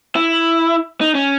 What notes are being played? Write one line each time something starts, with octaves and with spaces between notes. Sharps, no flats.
E4
D#4
C#4